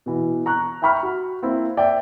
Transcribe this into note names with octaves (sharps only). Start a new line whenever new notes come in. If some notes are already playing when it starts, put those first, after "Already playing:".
B2 E3
A#5 C#6 F#6
E5 G5 A#5 B5 C#6 F6
F#4
A#3 C4 E4
D5 E5 G5